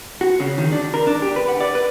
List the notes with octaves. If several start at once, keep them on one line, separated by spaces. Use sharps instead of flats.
F#4
C#3
D#3
D4
A#4
D4
G4
B4
F#5
D5
B4